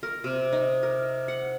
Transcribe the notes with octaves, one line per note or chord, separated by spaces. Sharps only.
A#4
C3
D#4
A#4
F#5